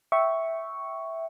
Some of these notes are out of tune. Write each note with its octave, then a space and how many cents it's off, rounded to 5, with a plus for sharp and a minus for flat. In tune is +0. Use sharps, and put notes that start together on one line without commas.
E5 -5 G5 -20 C#6 +0